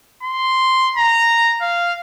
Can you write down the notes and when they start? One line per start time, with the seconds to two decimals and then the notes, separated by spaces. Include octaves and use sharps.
0.23 C6
0.96 A#5
1.62 F5